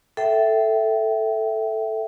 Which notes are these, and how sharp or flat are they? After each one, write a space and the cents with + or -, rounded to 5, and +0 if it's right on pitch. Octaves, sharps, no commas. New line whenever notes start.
A4 +0 E5 +0 G5 -25